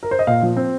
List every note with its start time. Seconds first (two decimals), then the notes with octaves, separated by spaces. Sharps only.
0.03 A#4
0.11 C5
0.19 D#5
0.27 A#2 F5
0.43 F3
0.57 C4